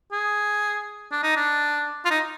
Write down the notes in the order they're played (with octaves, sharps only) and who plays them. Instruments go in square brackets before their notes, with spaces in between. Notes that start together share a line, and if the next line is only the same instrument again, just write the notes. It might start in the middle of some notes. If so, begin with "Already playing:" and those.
[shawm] G#4
D4
D#4
D4
F4
D#4